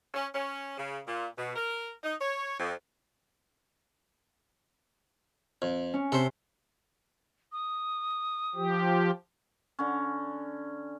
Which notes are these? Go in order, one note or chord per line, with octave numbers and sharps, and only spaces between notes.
C#4
C#4
C#3
A#2
B2
A#4
D#4
C#5
F2
F2
C#4
C3 A4 C5
D#6
F3 G4
D3 C#4